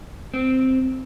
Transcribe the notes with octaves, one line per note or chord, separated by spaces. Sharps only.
C4